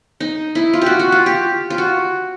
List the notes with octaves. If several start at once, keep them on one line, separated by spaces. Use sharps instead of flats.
D#4
E4
F4
F#4 G4
F#4
F4
G4
F4
F#4